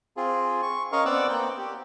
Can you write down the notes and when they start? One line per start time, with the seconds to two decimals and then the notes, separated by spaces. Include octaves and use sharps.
0.17 C4 F4 G#4
0.62 C#6
0.92 C#4 A#4 D#5 F5 C#6
1.05 B3 C4 D5 F#5 D6 E6
1.29 A#3 C4 G5
1.58 G4